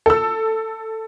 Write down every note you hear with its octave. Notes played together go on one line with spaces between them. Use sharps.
A4 E6